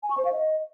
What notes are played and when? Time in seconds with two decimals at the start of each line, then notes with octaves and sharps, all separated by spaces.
0.03 G#5
0.10 C#6
0.18 C5
0.25 F5
0.32 D#5